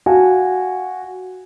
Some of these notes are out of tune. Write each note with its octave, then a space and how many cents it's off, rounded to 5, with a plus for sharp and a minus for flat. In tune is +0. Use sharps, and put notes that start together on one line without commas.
F#4 +0 F5 +0 G#5 -10